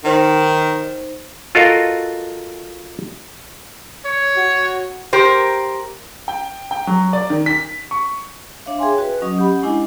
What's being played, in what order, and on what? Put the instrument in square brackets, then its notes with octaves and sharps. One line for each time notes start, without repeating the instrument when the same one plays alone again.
[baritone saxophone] D#3 [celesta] D#4 C5
[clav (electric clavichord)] F4 F#4 A4 A#4 D#5 F5
[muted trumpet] C#5
[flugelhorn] F#4
[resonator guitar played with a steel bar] G4 A#4 C5
[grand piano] G5
G5
F#3
D5
D#3
B6
C#6
[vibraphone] D4 C#5 E5 F5
G#4 E5 G5 G#5 C6
F#4 B4
F#3 C#4 D#5 D#6
C#4 G4 F#5 B5
G#3 D4 E4 D#5 G#5